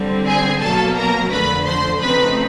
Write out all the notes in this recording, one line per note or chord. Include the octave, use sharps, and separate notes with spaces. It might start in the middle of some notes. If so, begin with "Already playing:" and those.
Already playing: D3 G3 C4
G#4 G#5
B2 F#3 A#3 A4 A5
A#4 A#5
F2 D3 F3 A3 B4 B5
C5 C6
C#3 F3 A3 C4 D#4 B4 B5